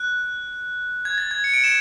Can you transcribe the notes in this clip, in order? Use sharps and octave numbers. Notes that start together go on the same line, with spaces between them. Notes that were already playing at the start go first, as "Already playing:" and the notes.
Already playing: F#6
G#6
A6
G#6
C#7
D7
E7